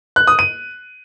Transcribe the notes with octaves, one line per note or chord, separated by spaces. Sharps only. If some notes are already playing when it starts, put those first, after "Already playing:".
F#6
D#6
D#7